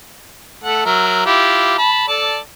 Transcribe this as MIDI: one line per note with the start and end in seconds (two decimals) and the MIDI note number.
0.64 0.86 57
0.64 0.86 69
0.64 0.86 78
0.86 1.22 54
0.86 1.22 70
0.86 1.22 76
1.26 1.76 64
1.26 1.76 65
1.26 1.76 67
1.78 2.05 81
1.78 2.05 83
2.08 2.38 69
2.08 2.38 74
2.08 2.38 81